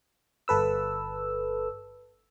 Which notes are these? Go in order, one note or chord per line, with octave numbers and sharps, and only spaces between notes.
G1 A4 B4 E6